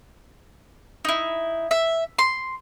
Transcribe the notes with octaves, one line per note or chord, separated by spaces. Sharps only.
D#4 E4
E5
C6